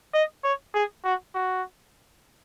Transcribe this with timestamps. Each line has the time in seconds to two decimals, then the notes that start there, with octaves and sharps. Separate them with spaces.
0.14 D#5
0.44 C#5
0.74 G#4
1.05 F#4
1.35 F#4